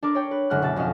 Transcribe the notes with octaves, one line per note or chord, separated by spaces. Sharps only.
D4 A#4 D6
C#5 D5 G5
B4
F#1 D3 G#3 F#5 F6 F#6
B2 G#3 E5 A6
F2 B2 C#4 D#5 F5 E7